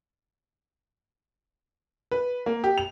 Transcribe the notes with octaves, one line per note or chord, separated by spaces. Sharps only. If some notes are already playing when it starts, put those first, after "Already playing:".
B4
A#3
G4
F7